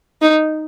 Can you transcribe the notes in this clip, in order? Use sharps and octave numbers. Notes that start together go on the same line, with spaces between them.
D#4